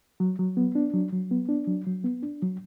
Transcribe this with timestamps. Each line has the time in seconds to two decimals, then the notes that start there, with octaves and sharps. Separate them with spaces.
0.20 F#3
0.39 F#3
0.57 B3
0.75 D4
0.94 F#3
1.12 F#3
1.31 B3
1.49 D4
1.67 F#3
1.87 F#3
2.04 B3
2.23 D4
2.42 F#3